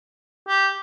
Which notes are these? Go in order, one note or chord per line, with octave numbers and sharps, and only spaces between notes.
G4